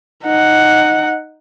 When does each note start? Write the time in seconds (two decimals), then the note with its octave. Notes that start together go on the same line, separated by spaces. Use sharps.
0.24 D#4 F#5